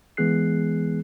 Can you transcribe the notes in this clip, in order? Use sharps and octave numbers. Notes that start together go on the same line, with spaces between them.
E3 G#3 B3 G#4 F#6 C7